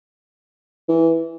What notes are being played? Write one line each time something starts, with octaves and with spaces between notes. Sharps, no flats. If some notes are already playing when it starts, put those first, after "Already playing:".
E3